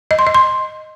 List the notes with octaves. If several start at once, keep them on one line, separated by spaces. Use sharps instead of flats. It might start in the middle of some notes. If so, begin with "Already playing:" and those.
D#5
C6
D#5
C6